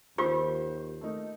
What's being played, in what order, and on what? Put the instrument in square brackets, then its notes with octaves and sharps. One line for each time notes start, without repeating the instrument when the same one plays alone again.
[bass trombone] D#2 [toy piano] F4 G4 [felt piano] C5 C#6
[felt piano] A3 A#3 D#4